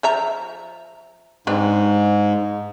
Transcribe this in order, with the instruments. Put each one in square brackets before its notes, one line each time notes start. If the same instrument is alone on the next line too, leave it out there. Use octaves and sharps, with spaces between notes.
[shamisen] F3 E5 A#5
[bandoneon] G#2 [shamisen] C4 D4 B4